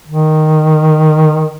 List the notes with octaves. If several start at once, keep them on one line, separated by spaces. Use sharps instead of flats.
D#3